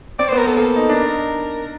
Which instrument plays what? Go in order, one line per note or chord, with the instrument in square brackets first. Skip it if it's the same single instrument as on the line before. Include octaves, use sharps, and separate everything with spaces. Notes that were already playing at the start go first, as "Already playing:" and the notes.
[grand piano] C4 [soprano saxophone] D5
[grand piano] B3 [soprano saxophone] C5
[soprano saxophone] A#4
[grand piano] B3 [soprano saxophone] A4
[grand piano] A#3 [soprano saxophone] A4
[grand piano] D#4
[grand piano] D4 [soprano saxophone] A#4
[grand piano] D#4